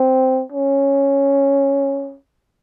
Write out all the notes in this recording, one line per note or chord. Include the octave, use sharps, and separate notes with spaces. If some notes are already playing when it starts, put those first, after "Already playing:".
Already playing: C4
C#4